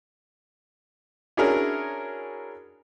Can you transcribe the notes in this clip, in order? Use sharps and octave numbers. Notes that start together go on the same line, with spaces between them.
C#4 D4 E4 F#4 G#4 A#4